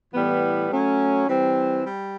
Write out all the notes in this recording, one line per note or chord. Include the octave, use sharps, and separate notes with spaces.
A2 E3 G3 B3
F#3 A3 C#4
E3 G3 C4
G3